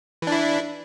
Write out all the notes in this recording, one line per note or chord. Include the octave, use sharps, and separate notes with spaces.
E3 D4 E4